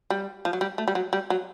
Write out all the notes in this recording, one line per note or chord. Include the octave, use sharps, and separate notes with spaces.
G3
F3
F#3
G3
A3
G3
F#3
G3
F#3